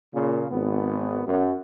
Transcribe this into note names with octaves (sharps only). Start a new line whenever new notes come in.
A#2 C#3
G#1 B3
F#2